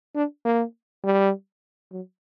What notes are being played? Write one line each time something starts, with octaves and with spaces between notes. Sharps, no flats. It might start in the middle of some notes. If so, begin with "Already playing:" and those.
D4
A#3
G3
F#3